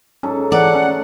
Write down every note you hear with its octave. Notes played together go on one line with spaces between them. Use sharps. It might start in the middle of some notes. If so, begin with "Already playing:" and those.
G#2 F#3 C#4 A4
E3 A3 D5 F#5
C#4